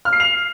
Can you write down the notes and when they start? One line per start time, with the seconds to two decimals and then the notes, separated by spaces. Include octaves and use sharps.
0.05 F6
0.13 C7
0.20 F7